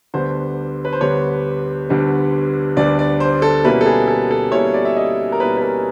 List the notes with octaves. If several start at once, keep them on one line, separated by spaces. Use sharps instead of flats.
D2 D3 G3 B3 C5
B4
C5
D2 D3 G3 B3 C#5
D2 D3 G3 B3
D2 D3 G3 B3 D5
D5
C5
A4
B2 G3 A#3 C#4 E4 B4
A4
G#4
A4
A4
B2 G3 A#3 C#4 E4 C#5
D5
E5
D#5
A#4
B2 G3 A#3 C#4 E4 B4
B4
A#4